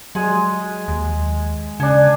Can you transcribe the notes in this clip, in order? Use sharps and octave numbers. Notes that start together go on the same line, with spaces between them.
F#3 G#3 G#5
D#2
C#3 D4 G#5